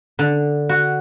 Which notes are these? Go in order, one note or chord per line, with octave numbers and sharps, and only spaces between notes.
D3
F#4